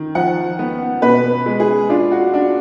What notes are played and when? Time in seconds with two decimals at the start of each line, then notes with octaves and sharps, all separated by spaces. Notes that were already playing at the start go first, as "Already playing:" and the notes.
Already playing: D#3
0.15 F3 F#5
0.59 B3
1.02 B2 B4
1.46 G#3
1.60 G#4
1.89 D4 F4
2.11 F#4
2.34 D4